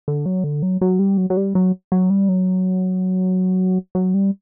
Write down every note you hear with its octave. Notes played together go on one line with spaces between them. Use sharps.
D3
F#3
D3
F#3
F#3
G3
F#3
F#3
G3
F#3
F#3
G3
F#3
F#3
G3